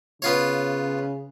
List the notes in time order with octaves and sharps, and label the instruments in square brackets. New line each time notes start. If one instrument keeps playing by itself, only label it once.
[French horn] C#3 [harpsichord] B3 F4 C#5